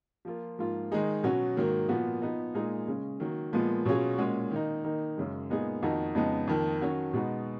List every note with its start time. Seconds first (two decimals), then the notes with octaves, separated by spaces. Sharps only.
0.25 F3 A#3 F4
0.58 G#2 F3 A#3 F4
0.91 D#3 G#3 D#4 G#4
1.23 B2 F#3 C#4 F#4
1.56 G#2 D#3 F#3 A#3
1.89 A#2 F3 B3 F#4
2.22 F3 B3 D#4
2.54 A#2 G#3 D#4 G#4
2.87 C#3 G#3 C#4
3.20 D#3 F#3 A#3
3.53 A#2 F3 G#3 B3
3.85 B2 F#3 C#4 F4 G#4
4.18 A#2 G#3 C#4 F#4
4.51 D#3 A#3 D#4
4.84 D#3 A#3 D#4
5.17 F#2 C#3 G#3
5.50 A#2 G#3 B3 D#4 G#4
5.83 F2 D#3 A#3 D#4 F#4
6.15 F2 C#3 G#3 B3 D#4
6.47 F2 D#3 A#3
6.81 D#3 F#3 C#4 F#4
7.13 B2 G#3 B3 D#4 F#4